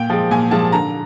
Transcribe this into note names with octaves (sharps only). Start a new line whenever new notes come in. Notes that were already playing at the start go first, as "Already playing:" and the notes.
Already playing: A#2 G5
F3 G#3
A#2 G#5
F3 G#3 A5
D3 A#5